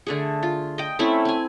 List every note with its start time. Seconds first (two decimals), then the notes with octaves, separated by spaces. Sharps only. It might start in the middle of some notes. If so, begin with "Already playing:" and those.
0.07 D3 A3 G#4
0.43 F4
0.78 D#5 G5
0.99 A3 C4 C#4 E4
1.25 C4 G#5